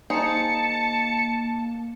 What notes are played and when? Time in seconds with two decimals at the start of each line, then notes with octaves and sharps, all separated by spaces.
0.10 A#3 D#4 G#4 C5 A5 C#7